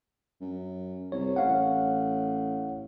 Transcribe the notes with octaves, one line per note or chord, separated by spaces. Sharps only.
F#2
C2 C#5
A1 C#5 F5 F#5